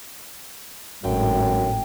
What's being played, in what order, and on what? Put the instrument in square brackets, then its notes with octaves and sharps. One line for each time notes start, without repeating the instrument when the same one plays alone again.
[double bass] G#1 A2 [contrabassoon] F#2 [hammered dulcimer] G5